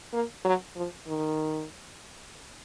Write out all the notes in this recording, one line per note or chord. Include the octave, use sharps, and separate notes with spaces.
A#3
F#3
F3
D#3